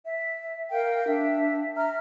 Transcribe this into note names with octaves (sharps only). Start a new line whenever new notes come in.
E5
A#4 F5 G5
D4 E5
E5 A#5 F6